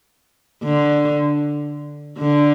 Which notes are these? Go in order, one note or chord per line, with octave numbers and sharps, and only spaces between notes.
D3
D3